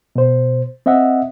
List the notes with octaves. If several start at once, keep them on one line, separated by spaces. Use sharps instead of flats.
B2 C5
C4 D#5 E5 F#5